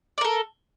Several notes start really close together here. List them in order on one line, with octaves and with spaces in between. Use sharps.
D5 A#4 A4